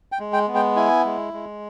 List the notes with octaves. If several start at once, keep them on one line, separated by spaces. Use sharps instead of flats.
G5
G#3
G5
B3
G5
E4 G#5
G#3
G#3